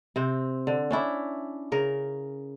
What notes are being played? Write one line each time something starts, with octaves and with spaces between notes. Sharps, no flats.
C3 C4
D3
C#4 D4 E4
C#3 A#4